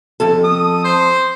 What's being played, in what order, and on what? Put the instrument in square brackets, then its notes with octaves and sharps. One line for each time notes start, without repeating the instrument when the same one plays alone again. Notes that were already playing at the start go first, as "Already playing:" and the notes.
[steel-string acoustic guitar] F2 A4
[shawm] D#6
C5